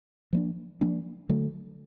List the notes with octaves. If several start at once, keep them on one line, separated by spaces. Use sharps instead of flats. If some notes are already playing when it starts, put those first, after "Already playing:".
F3 A#3 D4
F3 A#3 D4
D3 F#3 A3